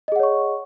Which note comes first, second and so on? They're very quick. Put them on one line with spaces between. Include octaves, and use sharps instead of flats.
D#5 G#4 F#5 C#5 C#6